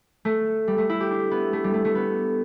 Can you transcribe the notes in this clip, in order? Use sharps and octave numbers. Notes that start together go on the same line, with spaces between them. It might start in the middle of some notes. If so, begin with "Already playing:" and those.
A3
G3
A3
E4
G4
D4
B3
A3
G3
A3
A3
B3